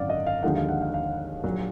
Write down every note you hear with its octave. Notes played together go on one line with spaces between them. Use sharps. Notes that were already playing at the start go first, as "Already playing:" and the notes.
Already playing: G#1 F#2 D3 D5 F5 F#5
D#5
F5
D#2 D3 F3 G#3 D#4 F#5
F5
F#5
F5
F5
A#1 A#2 F#3